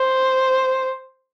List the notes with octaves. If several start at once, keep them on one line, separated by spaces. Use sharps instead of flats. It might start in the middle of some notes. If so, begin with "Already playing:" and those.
Already playing: C5